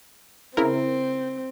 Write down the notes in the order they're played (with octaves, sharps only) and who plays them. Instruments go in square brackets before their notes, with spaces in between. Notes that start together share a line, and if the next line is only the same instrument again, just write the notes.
[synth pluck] C#3 E4 A#4 [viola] C4